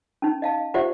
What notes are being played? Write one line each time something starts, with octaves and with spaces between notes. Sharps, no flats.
C#4 D#4
D#5 F5 A5
F4 G4 C5 D5 E5 F#5